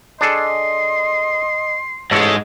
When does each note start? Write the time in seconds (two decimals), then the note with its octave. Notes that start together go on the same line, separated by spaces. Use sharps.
0.21 D4 G#4 A4 D#5 C6
2.11 A1 G#2 G#3 A4 C#5